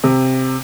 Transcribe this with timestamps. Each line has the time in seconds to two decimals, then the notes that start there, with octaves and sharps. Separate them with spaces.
0.04 C3